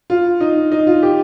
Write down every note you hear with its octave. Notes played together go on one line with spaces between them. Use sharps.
F4
D#4
D#4
F4
G4